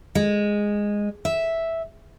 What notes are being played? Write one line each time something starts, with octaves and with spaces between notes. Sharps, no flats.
G#3
E5